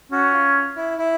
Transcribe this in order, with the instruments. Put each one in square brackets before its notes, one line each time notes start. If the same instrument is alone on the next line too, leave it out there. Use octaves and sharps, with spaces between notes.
[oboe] C#4 [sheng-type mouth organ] F#4
[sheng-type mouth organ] F4
E4
E4